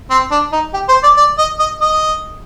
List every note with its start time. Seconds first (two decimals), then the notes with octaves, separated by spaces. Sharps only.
0.11 C4
0.31 D4
0.53 D#4
0.74 G4
0.89 C5
1.03 D5
1.17 D5
1.38 D#5
1.59 D#5
1.81 D#5